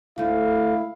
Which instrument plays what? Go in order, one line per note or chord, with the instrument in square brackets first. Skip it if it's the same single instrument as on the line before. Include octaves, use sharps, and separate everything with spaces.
[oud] D2 A3 [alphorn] E4 [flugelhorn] F5